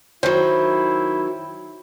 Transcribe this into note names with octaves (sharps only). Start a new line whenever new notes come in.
D#3 F#3 E4 C5